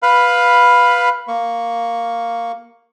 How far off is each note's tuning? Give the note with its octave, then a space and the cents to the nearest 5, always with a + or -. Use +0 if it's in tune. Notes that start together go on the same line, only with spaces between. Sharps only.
B4 +0 F5 +10 B5 +0
A#3 +0 C#6 +0